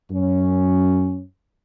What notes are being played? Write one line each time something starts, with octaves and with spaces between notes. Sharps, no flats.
F#2 C#4